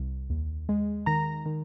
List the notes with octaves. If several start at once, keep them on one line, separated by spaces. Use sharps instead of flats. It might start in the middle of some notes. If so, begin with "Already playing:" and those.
Already playing: C2
D#2
G#3
D#3 A#5 A#6
D#3